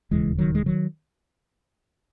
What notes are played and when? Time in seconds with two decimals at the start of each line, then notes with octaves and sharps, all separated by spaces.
0.11 E1 D#2 C#3 E3 G#3
0.38 D#3 F#3
0.55 G#3
0.66 D#3 F#3